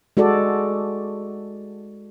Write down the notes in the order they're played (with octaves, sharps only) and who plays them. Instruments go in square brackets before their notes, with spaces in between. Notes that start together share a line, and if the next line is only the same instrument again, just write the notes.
[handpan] G#3 F#4 A4 D5